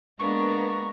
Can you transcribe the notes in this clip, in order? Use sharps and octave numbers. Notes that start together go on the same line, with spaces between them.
G#3 A#3 B3 D4 A#5 C#6